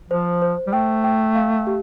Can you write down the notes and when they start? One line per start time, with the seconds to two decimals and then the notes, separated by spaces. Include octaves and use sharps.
0.10 F3 C5
0.42 C5
0.67 G3
0.73 A3 G5
1.04 G5
1.35 F5
1.67 G4